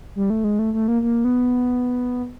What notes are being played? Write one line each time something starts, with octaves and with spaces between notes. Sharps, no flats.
G3
A3
G#3
A3
A3
A#3
A#3
B3